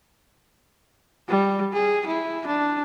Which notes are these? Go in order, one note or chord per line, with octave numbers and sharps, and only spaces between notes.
G3
G#4
E4
D4